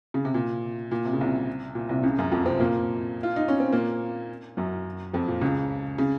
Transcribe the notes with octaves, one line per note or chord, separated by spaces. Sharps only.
C#3
C3
A#2
A#2
C3
C#3
C2 C3
A#2
C2 C3
C#2 C#3
F#2 F#3
F2 F3
C3 C4
A#2 A#3
F4
D#4
C#4
C4
A#2 A#3
F#2 F#3
F2 F3
A#2
C#2 C#3
C#3